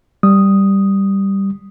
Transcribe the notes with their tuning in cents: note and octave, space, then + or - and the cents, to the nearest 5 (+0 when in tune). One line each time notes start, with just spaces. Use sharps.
G3 +0 D#6 +0